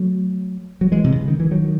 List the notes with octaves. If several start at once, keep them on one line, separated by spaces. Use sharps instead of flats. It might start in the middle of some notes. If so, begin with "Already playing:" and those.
Already playing: F#3 A3
F#3
E3 G#3
C3
C#3
D#3
E3
D#3 F#3